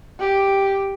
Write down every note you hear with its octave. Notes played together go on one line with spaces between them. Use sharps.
G4